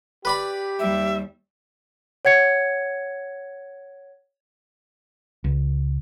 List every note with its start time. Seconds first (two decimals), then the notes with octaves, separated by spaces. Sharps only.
0.25 G4 B4 D5 B5
0.79 D#2 G3 E5
2.25 C#5 F#5 G#6 C#7
5.44 C#2